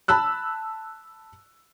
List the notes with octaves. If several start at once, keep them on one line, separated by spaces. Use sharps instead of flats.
A5 B5 E6 F#6